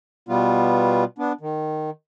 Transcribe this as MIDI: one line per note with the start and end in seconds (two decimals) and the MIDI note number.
0.29 1.04 47
0.29 1.04 55
0.29 1.04 59
0.29 1.04 65
1.18 1.32 59
1.18 1.32 62
1.41 1.90 51